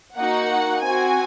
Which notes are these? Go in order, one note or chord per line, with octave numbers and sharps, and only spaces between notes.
A#3 D#4 F#4 F#5
C4 F#4 G#5